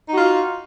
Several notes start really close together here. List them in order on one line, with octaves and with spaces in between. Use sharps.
D#4 F#4 F4